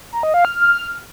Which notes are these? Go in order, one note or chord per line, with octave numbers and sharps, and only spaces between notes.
A#5
D#5
F5
F6
F6